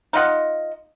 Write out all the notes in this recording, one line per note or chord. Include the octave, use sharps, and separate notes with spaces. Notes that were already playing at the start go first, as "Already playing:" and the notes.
D#4 F4 D#5 F#5